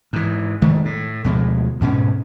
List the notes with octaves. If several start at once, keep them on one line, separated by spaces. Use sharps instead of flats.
G#2 E3
F1 D#3 G#3 A3
A2
D2 B2 F3 G#3
D2 G#2 B2 C#4